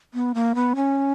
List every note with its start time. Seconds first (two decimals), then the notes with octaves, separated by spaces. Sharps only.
0.14 B3
0.34 A#3
0.55 B3
0.76 C#4